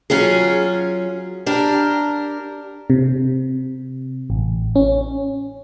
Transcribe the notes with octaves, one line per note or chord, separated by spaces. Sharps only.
F#3 C#4 F4 G#4
D4 G4 A#4
C3
A1
C#4